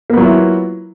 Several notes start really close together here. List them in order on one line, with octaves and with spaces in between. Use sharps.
A#3 B3 F#3 F4 E4